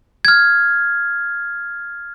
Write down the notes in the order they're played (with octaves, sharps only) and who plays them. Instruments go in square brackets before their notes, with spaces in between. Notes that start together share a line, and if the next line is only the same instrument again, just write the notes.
[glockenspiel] F6 G#6